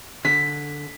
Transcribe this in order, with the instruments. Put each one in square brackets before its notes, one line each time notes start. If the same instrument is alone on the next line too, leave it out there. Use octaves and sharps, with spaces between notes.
[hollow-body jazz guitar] D3 [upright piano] B6